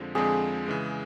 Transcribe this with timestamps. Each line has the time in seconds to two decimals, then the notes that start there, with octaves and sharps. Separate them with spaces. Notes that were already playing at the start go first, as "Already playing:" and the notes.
Already playing: F2 D3 F3 G#3 C4
0.15 F2 D3 F3 G#3 C4 G#4
0.66 C#3 E3 G#3